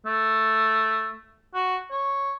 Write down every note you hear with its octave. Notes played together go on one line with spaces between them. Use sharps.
A3
F#4
C#5